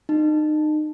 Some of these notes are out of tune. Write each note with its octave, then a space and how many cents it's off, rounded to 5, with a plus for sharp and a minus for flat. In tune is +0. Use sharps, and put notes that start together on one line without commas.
D#4 -30